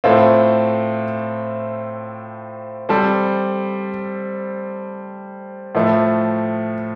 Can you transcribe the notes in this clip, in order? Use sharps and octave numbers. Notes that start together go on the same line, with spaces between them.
A2 A3 C4 F4
G3 C4 A4 C5
A2 F3 A3